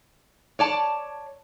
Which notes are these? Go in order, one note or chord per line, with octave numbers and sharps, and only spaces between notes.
C#5 D5 A5